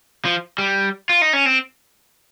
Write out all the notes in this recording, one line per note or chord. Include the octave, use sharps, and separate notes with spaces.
F3
G3
F4
D#4
C#4
C4